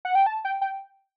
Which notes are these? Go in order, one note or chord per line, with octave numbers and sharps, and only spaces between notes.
F#5
G5
A5
G5
G5